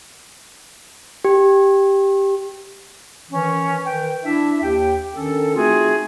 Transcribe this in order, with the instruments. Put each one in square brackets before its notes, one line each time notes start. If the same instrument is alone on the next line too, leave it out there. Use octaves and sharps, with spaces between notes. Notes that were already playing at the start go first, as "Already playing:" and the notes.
[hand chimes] G4
[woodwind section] D#3 E3 C#4
D#3 B4 G5
D4 E4 E5
D#2 G4 G5
D#3 C#4 D4 A4
A3 C4 D#4 F4 F#4 G#4